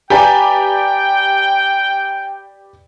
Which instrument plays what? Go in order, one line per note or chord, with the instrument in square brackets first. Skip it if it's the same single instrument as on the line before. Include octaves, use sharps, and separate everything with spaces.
[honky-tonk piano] G4 B4 D5 [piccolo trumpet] G5 [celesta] G#5 A#5